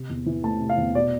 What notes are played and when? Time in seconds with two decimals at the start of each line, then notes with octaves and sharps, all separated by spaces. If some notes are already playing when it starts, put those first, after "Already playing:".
Already playing: C3
0.10 E2
0.26 E3
0.43 A3 A5
0.60 C3
0.70 F5
0.78 E2
0.95 B2 D5